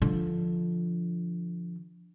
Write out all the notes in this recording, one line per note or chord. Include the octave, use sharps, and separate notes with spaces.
D3 F3